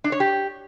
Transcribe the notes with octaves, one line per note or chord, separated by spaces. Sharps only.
D4
C#5
G4